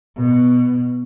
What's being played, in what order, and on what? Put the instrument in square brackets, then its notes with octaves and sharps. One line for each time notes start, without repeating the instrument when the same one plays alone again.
[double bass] B2